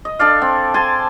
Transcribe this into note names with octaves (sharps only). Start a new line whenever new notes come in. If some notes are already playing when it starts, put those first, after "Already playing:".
D#5
D4 A4 D5 F5
C4
G#5 A5 C6